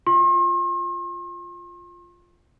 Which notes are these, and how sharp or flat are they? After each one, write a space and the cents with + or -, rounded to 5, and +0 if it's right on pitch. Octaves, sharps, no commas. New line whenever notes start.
F4 +0 C6 +45